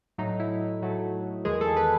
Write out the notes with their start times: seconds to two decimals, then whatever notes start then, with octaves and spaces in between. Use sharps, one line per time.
0.18 A2 F#3 A3 D#4
0.40 E4
0.82 A2 F#3 A3
1.45 E2 D#3 G#3 G#4
1.61 A4
1.77 B4